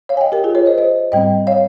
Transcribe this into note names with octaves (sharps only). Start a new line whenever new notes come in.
C#5 F5
G#5
D#5 G5
G4 A#4
F4 G#4
A#4 C#5
C5 D#5
C5 D#5
G#2 G3 C4 D#5 G5
C#5 F5